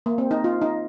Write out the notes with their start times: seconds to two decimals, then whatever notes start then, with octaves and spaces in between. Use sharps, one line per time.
0.06 A#3
0.18 C4
0.31 D#4
0.44 F4
0.62 D#4